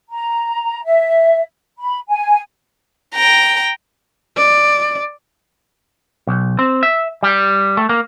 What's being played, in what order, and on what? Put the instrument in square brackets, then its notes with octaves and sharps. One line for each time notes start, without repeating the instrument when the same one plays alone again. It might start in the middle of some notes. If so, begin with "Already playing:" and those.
[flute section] A#5
E5
B5
G#5
[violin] G5 A#5
[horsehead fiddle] D5
[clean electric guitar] B1
C4
E5
G3
A3
A#3